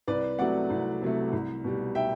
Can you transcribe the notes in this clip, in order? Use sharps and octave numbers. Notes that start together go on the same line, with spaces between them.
C2 B4 D5
C3 F#3 A3 D5 F#5
C2
C3 F#3 A3
C2
B2 G3
E5 G5